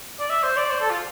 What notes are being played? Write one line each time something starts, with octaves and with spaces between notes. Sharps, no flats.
D5
E5
C5
D5
C5
A4
F4